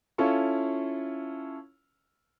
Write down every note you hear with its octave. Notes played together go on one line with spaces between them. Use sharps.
C#4 E4 F4 A4 C#6